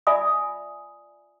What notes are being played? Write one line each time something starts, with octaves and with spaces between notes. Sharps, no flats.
F4 D5 E5 G#5 B5 D#6